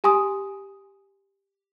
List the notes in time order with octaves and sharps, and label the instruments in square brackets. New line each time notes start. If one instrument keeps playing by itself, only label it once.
[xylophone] G4 G#5 C6 D#6